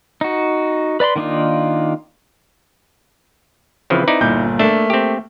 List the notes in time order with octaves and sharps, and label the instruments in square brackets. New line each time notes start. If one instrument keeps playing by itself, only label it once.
[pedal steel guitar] D#4 F#4
B4 D5 B5 C6
D#3 A#3 D4 D#4 F4
[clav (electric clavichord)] C#3 E3 F3 [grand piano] C4 B4
[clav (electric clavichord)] D#4 E4 D5
[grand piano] G1 A#2 G6
[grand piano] A3 A#3 [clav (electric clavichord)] D4 E5
[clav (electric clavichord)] C4 G4